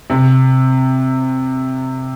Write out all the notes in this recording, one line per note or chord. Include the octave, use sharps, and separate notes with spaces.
C3